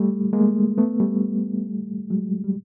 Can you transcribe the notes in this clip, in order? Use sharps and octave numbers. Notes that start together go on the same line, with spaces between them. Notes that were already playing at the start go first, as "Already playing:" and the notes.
Already playing: G3 A3
G#3 A#3
A3 B3
G3 A3
F#3 G#3
G3